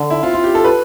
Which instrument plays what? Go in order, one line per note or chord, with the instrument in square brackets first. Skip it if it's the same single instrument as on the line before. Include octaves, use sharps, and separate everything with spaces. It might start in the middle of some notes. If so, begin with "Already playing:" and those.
Already playing: [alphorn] D3
[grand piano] E4
[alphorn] C4 [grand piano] F4
[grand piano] F4
G4
A4
B4